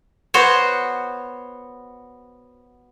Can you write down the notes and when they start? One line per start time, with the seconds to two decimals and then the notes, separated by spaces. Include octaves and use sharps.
0.34 B3 F#4 C5 C#5